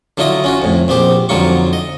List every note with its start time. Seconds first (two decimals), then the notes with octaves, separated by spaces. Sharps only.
0.17 D3 F#3 E4 F4 D#5 D#6
0.44 C#4 F4 F#4
0.62 F2 A2
0.88 A#1 B3 C4 G4 C5
1.29 F2 D3 F#3 D#4 F4 C#6
1.73 D#5